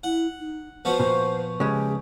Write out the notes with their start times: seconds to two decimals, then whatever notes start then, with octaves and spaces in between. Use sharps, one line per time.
0.04 E4 F#5
0.39 D#4
0.85 F3 B3 F#4 C5
1.00 A#2
1.60 C#3 G#3 G4